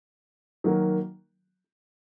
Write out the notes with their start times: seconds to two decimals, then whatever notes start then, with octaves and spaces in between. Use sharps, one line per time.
0.64 D#3 F#3 A#3